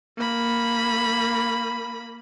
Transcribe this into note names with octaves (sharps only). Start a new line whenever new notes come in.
A#3 B5